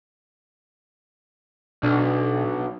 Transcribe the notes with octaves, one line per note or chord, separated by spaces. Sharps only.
B1 B2 D4